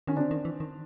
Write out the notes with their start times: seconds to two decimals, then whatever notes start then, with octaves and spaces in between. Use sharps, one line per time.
0.07 D#3 C#4
0.16 D3 C4 D4
0.31 D#3
0.45 E3
0.60 D#3